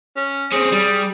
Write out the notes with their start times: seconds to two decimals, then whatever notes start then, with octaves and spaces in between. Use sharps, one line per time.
0.16 C#4
0.52 C4 C#4 G#4
0.72 G3